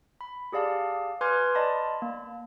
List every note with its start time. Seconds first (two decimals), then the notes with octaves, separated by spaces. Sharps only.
0.21 B5
0.52 G4 G#4 D5 F5 A5
1.21 B4 G#5 C6 D6 F6 G#6
1.55 D5 D#5 A5 B5 C6
2.02 A#3